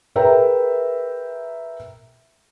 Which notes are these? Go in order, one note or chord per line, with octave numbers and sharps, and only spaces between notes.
G#4 A#4 B4 E5 G5 A#5